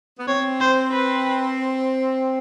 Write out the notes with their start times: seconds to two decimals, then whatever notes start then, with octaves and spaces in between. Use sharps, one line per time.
0.19 B3
0.28 C4 C#5
0.60 C5
0.91 B4